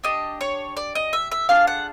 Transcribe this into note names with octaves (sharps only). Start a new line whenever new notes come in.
D4 G4 D#5
C#5
D5
D#5
E5
E5
D4 F4 G#4 F5
F#5